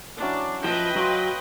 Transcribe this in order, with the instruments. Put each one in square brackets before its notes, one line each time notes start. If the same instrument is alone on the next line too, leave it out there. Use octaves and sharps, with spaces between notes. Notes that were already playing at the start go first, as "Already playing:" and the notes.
[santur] F#3 C#4 E4 [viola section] D4
[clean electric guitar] F3 [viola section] B4 D#5 G5
[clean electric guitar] F#3 [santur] C#5 F5 C6